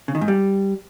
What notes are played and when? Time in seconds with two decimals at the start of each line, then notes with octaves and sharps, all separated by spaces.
0.08 C#3
0.15 D#3
0.21 G#2
0.28 G3